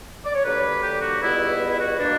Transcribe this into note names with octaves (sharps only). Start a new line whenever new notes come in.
D5
C#5
D2 D3 G3 A#3 B4
G4
F#4
C#2 B2 G3 B3 E4
E4
F#4
B2 A#3 D4